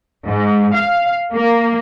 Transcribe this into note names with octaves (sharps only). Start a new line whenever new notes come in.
G#2
F5
A#3